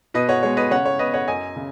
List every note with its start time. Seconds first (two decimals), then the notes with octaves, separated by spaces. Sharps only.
0.14 B2 B4 D#5
0.29 C#5 F#5
0.43 G#3 B3 C#5
0.57 B4 D#5
0.71 C#3 C#5 F#5
0.86 C#5
0.99 B3 B4 D#5
1.14 C#5 F#5
1.28 F#2 D#5 G#5
1.56 C#3